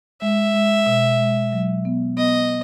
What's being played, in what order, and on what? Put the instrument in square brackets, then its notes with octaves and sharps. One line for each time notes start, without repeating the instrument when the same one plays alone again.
[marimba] G#3 [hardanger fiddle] E5
[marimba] G#3
B2
G#3
F#3
B3
[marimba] B3 [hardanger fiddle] D#5